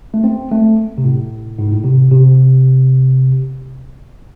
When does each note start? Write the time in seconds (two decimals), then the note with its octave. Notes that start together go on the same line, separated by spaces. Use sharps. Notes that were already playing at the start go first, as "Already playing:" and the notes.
0.14 A3
0.24 C4
0.52 A3
0.98 C3
1.04 A2
1.59 G#2
1.72 A2
1.84 C3
2.11 C3